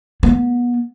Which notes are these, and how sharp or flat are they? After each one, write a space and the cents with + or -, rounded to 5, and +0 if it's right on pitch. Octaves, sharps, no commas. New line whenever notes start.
B3 -30